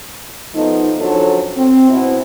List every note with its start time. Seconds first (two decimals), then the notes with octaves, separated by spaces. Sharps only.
0.54 F3 A3 B3 D#4
1.00 C#3 F3 F#3 D4 F#4 A4
1.57 C4
1.90 B2 C4 E4